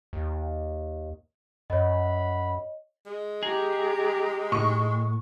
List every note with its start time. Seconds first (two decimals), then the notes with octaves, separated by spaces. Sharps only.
0.13 D#2
1.70 F#2 C#5 D#5 F#5 B5
3.06 G#3
3.43 G4 G#4 A#5
4.52 A2 C#6